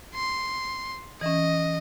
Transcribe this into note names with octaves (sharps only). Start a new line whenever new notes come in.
C6
E3 C#4 D#5